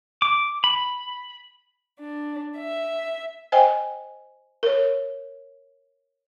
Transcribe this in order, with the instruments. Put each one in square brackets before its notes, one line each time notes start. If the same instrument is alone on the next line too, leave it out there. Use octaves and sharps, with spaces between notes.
[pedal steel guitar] D6
B5
[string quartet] D4
E5
[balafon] C5 D#5 G5 G#5
A#4 C#5